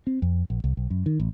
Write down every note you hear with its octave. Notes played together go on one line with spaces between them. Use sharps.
C4
F2
A#1
C2
B1
F#2
D#3
A1